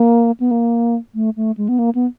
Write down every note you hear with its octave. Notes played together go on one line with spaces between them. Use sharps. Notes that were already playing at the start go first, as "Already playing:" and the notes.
Already playing: A#3
B3
A#3
A3
A3
G#3
B3
A#3
B3